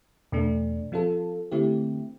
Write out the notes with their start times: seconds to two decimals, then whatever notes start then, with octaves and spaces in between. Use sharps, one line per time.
0.32 E2 B2 A3 D4
0.92 F3 C4 F4 A4
1.52 D3 A3 C4 E4 G4